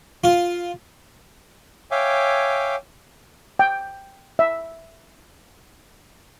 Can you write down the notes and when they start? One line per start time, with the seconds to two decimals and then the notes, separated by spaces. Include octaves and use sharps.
0.24 F4
1.91 C#5 E5 F5 G5 G#5 D6
3.59 G5
4.39 E5